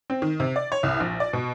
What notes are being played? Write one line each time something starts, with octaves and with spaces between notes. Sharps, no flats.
C4
D#3
C3
D5
C#5
C2
A#1
D5
B2